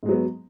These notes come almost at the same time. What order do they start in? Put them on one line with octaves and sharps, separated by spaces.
G#2 G#3 F#3 B3